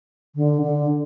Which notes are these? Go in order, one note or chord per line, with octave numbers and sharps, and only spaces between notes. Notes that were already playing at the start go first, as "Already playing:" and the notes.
D3
D3